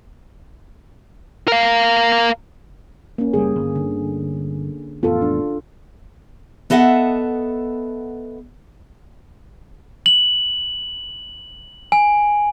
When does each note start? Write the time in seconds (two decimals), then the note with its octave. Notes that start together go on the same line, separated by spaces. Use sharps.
1.48 A#4 F5
3.18 A#3 C#4
3.33 F#1 G3 G#4
3.56 G1
3.75 D3
5.03 A1 F2 B3 F4 A4
5.22 D4
6.70 B3 A4 D#5 E5 F#5
10.06 F#7
11.92 G#5